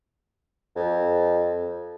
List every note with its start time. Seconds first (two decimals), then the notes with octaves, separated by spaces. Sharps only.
0.76 F2